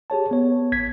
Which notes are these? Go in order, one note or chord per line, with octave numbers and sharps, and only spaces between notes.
G4 G#4 C#5 A5
B3 C#5
A1 G#6 B6